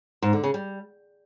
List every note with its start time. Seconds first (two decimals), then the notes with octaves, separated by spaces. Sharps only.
0.22 G#2
0.33 D3
0.44 C#3
0.54 G3